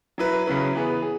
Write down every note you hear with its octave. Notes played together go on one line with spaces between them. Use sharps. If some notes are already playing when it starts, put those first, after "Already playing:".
F#3 E4 B4
C#3 F#3 C#4 E4 B4
E3 B3 G#4 B4
G#4